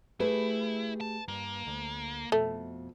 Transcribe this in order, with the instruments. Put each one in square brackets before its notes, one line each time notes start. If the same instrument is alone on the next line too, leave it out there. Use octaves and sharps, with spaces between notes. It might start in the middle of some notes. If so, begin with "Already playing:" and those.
[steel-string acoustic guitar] A3 G4 G#4 [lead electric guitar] E4 [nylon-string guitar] B4
[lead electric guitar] A5
[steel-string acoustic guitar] G2 [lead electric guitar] A#3
[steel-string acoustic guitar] D2
[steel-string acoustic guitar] F2 B2 [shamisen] A3